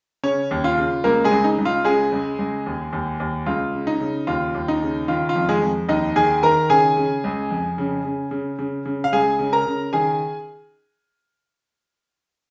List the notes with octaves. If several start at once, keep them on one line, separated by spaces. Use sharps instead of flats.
C#3 C#4 C#5
D#2
F4
C#3
C#2 A#3 A#4
G#3 G#4
C#2
D#4
C#2
F4
C#3 G#3 G#4
C#2
C#2
D#2
D#2
D#2
C#2 F4
C#3
D#4
C#3
D#2 F4
D#2
D#4
C#3
D#3 F4
F4
F2
G#3 G#4
F2
D#2 D#4 D#5
D#3 G#4 G#5
D#3 A#4 A#5
C#3 G#4 G#5
C#3
C#2
F2
C#3
C#3
C#3
C#3
C#3
F5
C#2 G#4 G#5
C#3
A#4 A#5
C#3
D#3 G#4 G#5